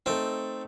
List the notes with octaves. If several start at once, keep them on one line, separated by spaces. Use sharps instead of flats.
A3 C4 D#4 A4